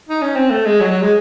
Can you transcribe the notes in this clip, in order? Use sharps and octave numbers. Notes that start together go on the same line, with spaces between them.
D#4
C#4
C4
A3
G#3
F#3
F#3
G#3